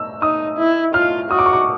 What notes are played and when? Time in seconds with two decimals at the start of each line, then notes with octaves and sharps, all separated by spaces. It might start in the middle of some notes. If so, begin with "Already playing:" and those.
Already playing: E6
0.22 D#4 D#6
0.58 E4
0.94 F4 F6
1.31 F#4 D#6
1.39 D6
1.46 C#6
1.53 D6